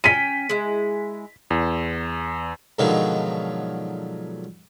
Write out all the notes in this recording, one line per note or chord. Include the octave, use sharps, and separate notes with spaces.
C#4 G5 B6 D#7
G#3 E4
E2
G#2 B2 D3 D#3 F3 F#3